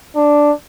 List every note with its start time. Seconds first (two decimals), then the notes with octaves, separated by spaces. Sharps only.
0.15 D4